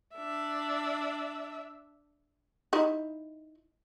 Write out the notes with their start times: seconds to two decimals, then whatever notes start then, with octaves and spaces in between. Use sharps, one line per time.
0.15 D4 E5
2.73 D#4 E4 D#5